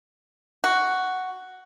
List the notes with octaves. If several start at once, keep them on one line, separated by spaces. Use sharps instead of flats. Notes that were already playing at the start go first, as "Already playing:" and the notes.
F#4